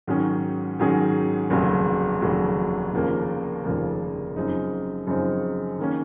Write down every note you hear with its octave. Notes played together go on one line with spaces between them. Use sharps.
G#2 D#3 F#3 C#4 G#4
G#2 D#3 F#3 C#4 G#4
F1 D#2 C#3 F#3
F1 D#2 C#3 F#3
F1 D#2 C#3 F3 A#3
F1 D#2 C#3 F3 A#3
F#2 C#3 F3 C4 D#4
F#2 C#3 F3 C4 D#4
D#3 A#3 C#4